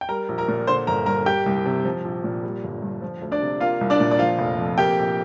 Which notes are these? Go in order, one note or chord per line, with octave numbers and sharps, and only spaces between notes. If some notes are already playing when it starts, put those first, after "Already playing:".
G5
G3 A#4 A#5
A#1
A#4 A#5
A#2
D3 C5 C6
G1 A#4 A#5
G2 A#4 A#5
A#3 G4 G5
C2
C3
F3
A#1
A#2
G3
G1
G2
F3
D2
D4 D5
C3
A#3 F4 F5
C2
D4 D5
A#2
D5
F3 F4 F5
F1
F2
A#3 G4 G5
A#1